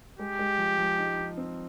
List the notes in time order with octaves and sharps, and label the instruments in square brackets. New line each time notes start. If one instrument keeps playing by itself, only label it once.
[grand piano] G#3 [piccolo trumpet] G4
[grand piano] G#3
F3
F3
D#4
D#4
C4